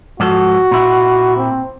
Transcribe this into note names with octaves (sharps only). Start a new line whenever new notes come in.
G#2 F3 F#4 A4
A#2 E4
C4